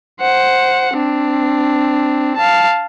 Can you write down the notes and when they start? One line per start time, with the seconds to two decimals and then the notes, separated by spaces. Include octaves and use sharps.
0.21 C5 F#5
0.95 C4 D4
2.37 F5 A5